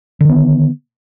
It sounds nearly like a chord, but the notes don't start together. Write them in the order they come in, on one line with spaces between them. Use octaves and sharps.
D3 D#3 B3